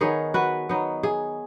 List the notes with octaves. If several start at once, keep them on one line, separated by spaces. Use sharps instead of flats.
D#3 B3 D#4 G#4 C#5
F#4 B4
F#3 B3 D#4
G#4